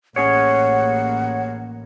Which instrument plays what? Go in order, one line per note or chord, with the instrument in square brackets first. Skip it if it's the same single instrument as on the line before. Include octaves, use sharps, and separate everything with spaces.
[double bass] A1 A#3 [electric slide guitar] C#4 G#4 C#5 [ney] F#5